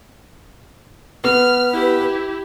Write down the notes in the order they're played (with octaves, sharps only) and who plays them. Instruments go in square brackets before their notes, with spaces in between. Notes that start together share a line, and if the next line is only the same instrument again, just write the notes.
[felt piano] B3 [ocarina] B4 [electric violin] F6
[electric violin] E4 G4